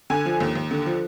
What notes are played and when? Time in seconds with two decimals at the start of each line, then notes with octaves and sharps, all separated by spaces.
0.10 D3 G#5
0.25 F3
0.40 D#2
0.55 D#2
0.71 D3
0.86 F3